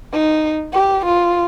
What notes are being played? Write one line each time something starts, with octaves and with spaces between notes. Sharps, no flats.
D#4
G4
F4